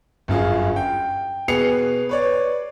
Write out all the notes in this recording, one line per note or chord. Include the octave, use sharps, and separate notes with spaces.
G1 F#2 F4 G#4
G5
B2 G#4 B4 C7 C#7 F7
B4 C#5 D5